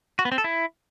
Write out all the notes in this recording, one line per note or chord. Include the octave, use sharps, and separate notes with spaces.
F#4
B3
C4
A4
E4